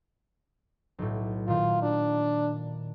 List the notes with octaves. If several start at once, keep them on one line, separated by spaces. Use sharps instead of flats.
B1 A2
A#2 D#3 F4
D4